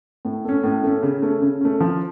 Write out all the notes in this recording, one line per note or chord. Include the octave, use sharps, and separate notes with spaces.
A2
A3 C#4
A2
A3 C#4
C#3
A3 C#4
C#3
A3 C#4
F3